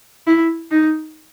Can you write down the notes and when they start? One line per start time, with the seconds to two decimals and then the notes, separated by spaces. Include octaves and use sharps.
0.27 E4
0.71 D#4